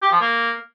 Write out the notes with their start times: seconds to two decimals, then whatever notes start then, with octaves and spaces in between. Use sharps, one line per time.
0.02 G4
0.12 F3
0.21 A#3